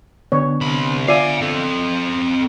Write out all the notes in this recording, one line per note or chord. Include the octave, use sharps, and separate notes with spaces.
D3 B3 D4 C#5
C2 B5
F4 D5 E5 F5 G#5
C4 A4